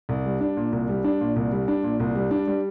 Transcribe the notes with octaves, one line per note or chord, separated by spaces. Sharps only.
C2
G3
D4
A#2
C2
G3
D4
A#2
C2
G3
D4
A#2
C2
G3
D4
G3